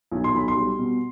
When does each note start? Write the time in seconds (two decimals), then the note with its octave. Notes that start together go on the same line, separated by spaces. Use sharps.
0.11 B1
0.24 C6
0.34 B1 B5
0.48 C6
0.56 G3
0.78 B2